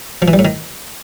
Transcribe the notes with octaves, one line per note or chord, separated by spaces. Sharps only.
F3
E3
G3
A2
D#3